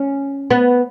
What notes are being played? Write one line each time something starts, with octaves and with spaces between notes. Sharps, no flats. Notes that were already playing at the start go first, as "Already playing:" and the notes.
Already playing: C#4
B3